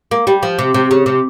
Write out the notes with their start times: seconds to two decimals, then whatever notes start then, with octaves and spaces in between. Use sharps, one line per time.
0.11 A#3
0.27 G3
0.43 F3
0.59 C3
0.74 C3
0.91 C#3
1.06 C3